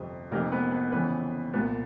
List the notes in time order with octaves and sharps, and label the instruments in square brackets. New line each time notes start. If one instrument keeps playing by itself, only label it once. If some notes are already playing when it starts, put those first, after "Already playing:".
Already playing: [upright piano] G1 F2 C3
F1 F2 C3 D#3 A#3 A#4
B3 B4
B3 B4
G1 F2 C#3 E3 B3 B4
C2 A#2 B3 B4